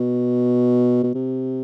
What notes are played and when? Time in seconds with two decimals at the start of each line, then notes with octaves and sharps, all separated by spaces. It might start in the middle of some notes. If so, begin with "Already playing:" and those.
Already playing: B2
1.03 B2
1.14 C3